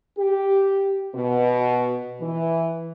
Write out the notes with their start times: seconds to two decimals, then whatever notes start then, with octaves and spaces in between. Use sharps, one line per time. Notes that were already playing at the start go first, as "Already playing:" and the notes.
0.19 G4
1.14 B2
2.21 E3